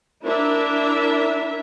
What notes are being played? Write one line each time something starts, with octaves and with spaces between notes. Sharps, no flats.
D4 E4 A#4 E5